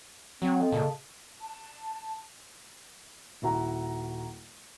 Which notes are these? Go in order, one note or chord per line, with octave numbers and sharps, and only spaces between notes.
F#3 C4
A4 D#5 F5
A#2 C#3 A5
A5
D#1 E4 F#4 A#5